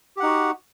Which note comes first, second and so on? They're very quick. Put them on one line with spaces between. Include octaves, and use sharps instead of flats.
G4 F#5 D#4 F#4